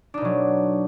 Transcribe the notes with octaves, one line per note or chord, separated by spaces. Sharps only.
B2 F#3 D4 D#4